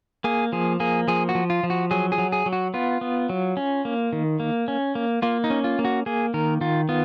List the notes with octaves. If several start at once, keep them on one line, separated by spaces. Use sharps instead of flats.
A#3 G#4
F3 G#4
A#3 G#4
F3 G#4
F#4
F3
F4
F3
F#4
F#3 G#4
G#4
F#3
G#4
F#3
F#4
B3 F4
B3
F#3
C#4
A#3
D#3
A#3
C#4
A#3
A#3 F4
D#4
C#4
F4
A#3
F#4
A#3 G#4
D#3 A#4
D#3 F4
B3 F4